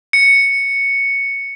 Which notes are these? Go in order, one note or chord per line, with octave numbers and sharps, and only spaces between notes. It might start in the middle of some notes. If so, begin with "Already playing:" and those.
C#7